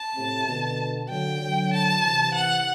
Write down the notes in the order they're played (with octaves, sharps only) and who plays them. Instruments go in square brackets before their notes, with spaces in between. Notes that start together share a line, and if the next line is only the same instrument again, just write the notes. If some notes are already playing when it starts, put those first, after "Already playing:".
Already playing: [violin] A5
[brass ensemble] A2 C3
B2 D3
[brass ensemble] D3 F#3 [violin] G5
[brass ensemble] D3 F#3
[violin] A5
[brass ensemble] C3 E3
[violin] F#5